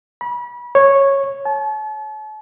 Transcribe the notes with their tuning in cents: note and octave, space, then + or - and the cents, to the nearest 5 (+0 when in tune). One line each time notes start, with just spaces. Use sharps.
B5 -30
C#5 -10
A5 -40